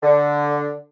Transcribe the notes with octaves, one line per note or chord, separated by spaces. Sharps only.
D3